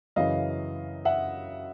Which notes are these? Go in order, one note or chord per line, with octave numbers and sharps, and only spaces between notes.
F#2 C#3 E3 D#5 F5
E5 F#5